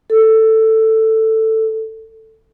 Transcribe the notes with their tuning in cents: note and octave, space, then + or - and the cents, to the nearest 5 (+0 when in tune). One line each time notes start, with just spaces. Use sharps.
A4 +10